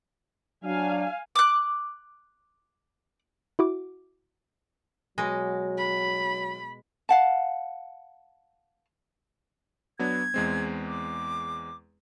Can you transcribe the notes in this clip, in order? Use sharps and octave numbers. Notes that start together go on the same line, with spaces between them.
F#3 D4 F5 G#5
D6 F#6
E4 F#4 D6
B2 F#3 G#3
B5
F5 F#5 A5
F#3 B3 D4 G#6
E2 G#3 C4
D6